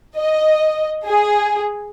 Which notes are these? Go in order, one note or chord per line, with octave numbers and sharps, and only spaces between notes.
D#5
G#4